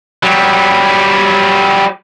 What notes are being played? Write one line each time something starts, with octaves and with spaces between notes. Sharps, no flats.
F#3 G3